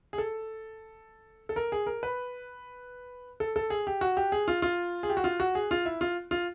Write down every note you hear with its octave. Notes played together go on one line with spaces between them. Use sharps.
G#4
A4
A4
A#4
G#4
A#4
B4
A4
A4
G#4
G4
F#4
G4
G#4
F4
F4
G#4
G4
F#4
F4
F#4
G#4
F4
E4
F4
F4